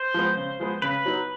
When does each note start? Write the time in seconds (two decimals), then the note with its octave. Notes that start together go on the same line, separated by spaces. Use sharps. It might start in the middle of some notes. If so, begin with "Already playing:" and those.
Already playing: C5
0.14 F3 G#3 B3
0.37 C#3
0.60 F3 G#3 B3
0.82 C#3 B4
1.06 F#3 B3 D#4